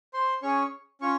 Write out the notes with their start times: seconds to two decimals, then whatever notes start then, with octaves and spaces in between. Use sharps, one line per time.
0.14 C5 C6
0.42 C#4 G#4 C#5 C#6
1.01 C#4 F4 C#5 C#6